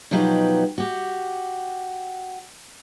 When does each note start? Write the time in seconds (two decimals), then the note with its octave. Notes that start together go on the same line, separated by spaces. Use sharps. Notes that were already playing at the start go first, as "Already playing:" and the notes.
0.11 B2 F3 F#3 D#4 G4 B4
0.78 F#4 G4